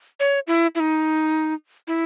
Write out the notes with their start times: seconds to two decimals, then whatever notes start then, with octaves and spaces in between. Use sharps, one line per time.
0.20 C#5
0.47 E4
0.75 E4
0.80 D#4
1.87 E4